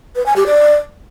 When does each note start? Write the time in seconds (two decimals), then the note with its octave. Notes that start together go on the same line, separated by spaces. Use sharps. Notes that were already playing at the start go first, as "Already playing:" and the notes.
0.16 B4
0.26 G#5
0.36 G4
0.46 D5